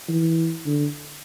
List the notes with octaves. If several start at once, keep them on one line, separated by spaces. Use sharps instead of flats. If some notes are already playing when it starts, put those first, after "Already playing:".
E3
D3